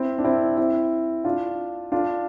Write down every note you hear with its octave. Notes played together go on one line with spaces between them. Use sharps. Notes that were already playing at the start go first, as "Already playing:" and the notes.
Already playing: C4 E4
D4
C4 E4
C4 E4
D4 F4
D4 F4